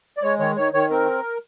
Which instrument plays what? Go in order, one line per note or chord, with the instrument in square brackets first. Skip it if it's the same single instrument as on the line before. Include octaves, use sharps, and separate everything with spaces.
[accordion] D5
G#3 C#5
D#3 C#5
D#3 C#5
D#3 C#5
C4 A#4